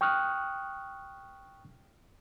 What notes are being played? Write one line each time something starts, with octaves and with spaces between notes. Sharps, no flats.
G5 C#6 D#6 F6 F#6